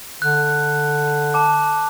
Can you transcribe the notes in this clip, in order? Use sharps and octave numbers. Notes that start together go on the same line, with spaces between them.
D3 F#6
A5 D6